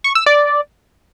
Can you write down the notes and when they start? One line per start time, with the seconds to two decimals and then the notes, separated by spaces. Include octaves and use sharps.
0.04 C#6
0.15 E6
0.26 D5